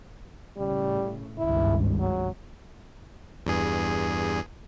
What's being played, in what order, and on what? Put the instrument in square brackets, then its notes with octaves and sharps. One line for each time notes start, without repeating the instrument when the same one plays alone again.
[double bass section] A2 C#3 [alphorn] G3
[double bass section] G#1 C#2 G2 [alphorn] E4
[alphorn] F#3
[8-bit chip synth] E2 G2 G#4